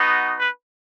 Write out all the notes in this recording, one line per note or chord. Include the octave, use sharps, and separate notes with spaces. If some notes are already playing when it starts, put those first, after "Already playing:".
Already playing: B3 D#4 F#4
B4